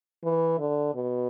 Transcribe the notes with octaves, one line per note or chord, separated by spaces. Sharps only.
E3
D3
B2